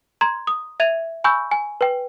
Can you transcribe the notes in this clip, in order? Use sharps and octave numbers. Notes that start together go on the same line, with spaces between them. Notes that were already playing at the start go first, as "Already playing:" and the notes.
A#5 C6 G#6
D#6
E5 G#6 D#7 F7
G#5 B5 C#6 E6 G6
G#5
B4 G5